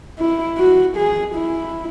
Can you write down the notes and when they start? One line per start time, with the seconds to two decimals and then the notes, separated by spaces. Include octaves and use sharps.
0.19 E4
0.58 F#4
0.96 G#4
1.35 E4